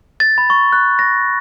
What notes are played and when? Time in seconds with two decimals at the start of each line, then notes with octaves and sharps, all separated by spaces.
0.20 A6
0.38 B5
0.50 C#6
0.73 F#6
0.99 A#6